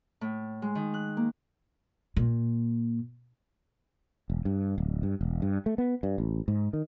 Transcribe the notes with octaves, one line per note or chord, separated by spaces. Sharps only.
A2
G#3
D#3
F#6
A#3
A#2
E1
G2
D1
G2
E1
G2
A3
B3
G2
A1
G#2
D#3